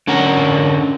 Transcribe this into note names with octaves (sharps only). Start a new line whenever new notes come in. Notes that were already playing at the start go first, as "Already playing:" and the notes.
D3 C#4 A#4 F#5